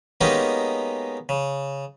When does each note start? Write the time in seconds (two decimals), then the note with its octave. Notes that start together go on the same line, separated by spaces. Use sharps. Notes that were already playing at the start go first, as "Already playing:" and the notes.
0.21 G#3 A#3 B3 C#4 D#4 G4
1.29 C#3